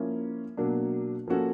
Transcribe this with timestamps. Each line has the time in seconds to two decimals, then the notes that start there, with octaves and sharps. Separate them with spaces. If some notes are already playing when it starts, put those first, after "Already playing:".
Already playing: F3 A#3 C#4 E4
0.57 B2 F#3 A#3 D4
1.28 F3 A#3 C#4 F#4 A4